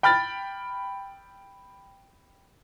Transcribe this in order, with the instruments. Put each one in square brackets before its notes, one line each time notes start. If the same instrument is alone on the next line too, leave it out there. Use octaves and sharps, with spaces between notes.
[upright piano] G5 B5 F6 A6